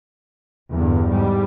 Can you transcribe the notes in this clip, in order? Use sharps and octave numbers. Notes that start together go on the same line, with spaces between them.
E2 G2 D3
G#2 G3